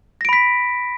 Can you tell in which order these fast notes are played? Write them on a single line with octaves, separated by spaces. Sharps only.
A#6 D7 B5 B6